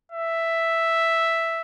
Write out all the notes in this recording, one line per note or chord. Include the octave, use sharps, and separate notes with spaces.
E5